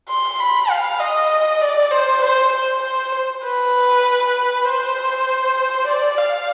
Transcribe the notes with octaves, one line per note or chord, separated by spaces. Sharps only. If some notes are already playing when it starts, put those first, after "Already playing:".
C6
B5
F5
D#5
D5
C5
C5
C5
C5
B4
C5
D5
F5